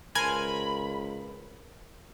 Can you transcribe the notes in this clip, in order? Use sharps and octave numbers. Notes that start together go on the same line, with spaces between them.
C#2 A#4 C5 G#5 B5